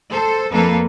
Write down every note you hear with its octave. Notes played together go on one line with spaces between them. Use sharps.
A4 C5
F2 A#3 A4 B4